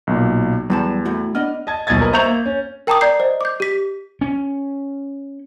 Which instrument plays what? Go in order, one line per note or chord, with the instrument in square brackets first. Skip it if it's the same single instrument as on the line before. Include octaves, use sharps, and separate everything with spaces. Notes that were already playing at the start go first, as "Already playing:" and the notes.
[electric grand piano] B1 A#2
[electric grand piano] E2 [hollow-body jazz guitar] F#3 G3 A5
[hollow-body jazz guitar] A2 A3 F#4
[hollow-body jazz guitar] B3 D4 D#5 [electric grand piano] F6
[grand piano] D#5 A5 G#6
D#1 B1 D#5 G#6 A6
A#4 B4 D#5
C5 E5 A#5 C#6 G6 F7
A#3
C#4
[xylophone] A#4 G5 A5 A#5 D6 D#6
D5 A#5 G6 C7
C5 D#5
D6 G6
G4 B6
[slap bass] C#4